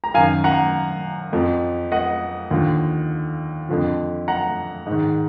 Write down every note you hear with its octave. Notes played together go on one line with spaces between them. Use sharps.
A#5
F#2 D#3 F5 G#5
F#5 A#5
F2 F3
D#5 F#5
D#2 D3 F3
F2 D3 F3
F#5 A#5
G#2 D#3